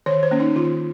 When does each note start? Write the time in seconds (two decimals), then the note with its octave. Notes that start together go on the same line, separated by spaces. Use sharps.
0.06 D#3 C#5
0.23 C5
0.31 A#3 C#4
0.40 D#4
0.56 D#3 F4